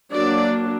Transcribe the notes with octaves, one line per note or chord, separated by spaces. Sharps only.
F#3 A#3 D4 D5